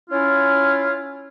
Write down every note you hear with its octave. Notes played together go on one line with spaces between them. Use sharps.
C#4 E4 F4